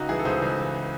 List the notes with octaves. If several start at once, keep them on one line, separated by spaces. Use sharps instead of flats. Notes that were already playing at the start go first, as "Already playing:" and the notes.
Already playing: C#2 D#4 F#4
E3 E4 G#4
A4
C#2 G#4 C5
C#2
E3